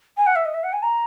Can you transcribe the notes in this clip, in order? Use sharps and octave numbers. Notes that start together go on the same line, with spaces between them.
G#5
F#5
E5
D#5
E5
F#5
G#5
A#5